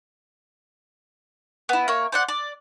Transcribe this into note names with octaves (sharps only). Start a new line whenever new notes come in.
B3 E4
A#3 C#5
C5 D5 F#5
D5